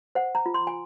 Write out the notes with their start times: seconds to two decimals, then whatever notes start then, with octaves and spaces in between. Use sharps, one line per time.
0.15 C5 F#5
0.35 A#5
0.46 F4
0.54 C6
0.67 G#5